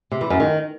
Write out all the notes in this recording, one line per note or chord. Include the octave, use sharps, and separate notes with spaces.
C3
E3
F#2
D#3